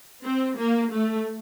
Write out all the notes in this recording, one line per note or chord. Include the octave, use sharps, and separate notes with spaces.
C4
A#3
A3